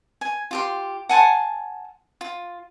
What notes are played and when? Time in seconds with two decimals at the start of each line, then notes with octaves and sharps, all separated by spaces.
0.21 G#5
0.51 F4 G4 C6
1.09 F#5 G#5 A5 C6
2.21 F4